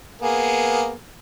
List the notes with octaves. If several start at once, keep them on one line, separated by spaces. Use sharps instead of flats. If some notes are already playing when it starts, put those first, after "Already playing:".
A#3 B3 G#4